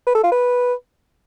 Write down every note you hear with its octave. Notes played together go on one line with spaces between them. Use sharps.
B4
A4
F4
B4